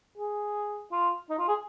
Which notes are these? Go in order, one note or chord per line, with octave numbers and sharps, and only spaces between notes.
G#4
F4
D#4
F4
G#4